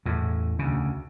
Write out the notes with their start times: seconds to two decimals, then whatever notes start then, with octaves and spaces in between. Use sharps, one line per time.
0.06 E2 A2
0.59 D2 C#3